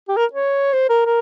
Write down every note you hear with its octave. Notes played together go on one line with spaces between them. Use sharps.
G4
A#4
C#5
C5
A#4
A#4